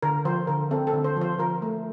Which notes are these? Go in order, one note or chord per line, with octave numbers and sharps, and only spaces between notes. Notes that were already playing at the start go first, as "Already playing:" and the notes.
D3 A#4
F3 C5
D3 A#4
C4 A4
A4
D3
C5
F3
C5
F3 A#4
A3